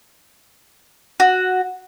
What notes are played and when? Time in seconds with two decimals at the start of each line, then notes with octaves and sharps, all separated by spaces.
1.20 F#4